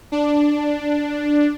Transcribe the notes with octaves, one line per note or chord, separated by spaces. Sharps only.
D4